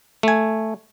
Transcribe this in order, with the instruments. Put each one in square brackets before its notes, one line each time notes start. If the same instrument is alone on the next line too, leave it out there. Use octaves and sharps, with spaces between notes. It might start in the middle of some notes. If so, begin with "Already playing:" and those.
[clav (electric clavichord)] A3 G#5